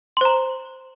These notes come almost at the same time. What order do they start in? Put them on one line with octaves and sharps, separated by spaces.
C6 C5 A#5